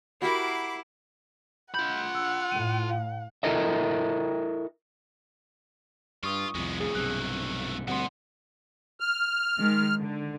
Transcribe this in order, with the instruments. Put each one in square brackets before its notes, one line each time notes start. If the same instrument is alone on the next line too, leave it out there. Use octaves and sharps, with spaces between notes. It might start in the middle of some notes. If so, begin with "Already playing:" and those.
[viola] E4 [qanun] F#4 G4 A#4 [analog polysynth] B5 [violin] D6 C7
[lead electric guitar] F4 B5 [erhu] F#5 [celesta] G6
[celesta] E6
[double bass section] A2 [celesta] D#7
[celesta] F5
[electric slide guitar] E4 A4 A#4 D#5 E5
[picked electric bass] G2 [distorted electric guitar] F4 [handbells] C#6 D#6
[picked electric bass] C2 F2 [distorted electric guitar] G#3 B3
[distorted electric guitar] A2 C#3 [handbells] G#4
[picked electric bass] B1 G2 C3 [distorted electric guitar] A3 A#3 [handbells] F#6
[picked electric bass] D2 G3 C4 [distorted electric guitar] B2 B3 [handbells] F#5 C6
[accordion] F6
[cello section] D#3 G#3
D3